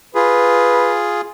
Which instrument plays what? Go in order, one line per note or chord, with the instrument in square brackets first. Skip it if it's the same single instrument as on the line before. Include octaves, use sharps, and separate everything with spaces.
[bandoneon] F4 G#4 [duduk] B4